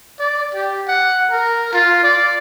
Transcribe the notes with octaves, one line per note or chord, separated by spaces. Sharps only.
D5
G4
F#5
A#4
F4
D5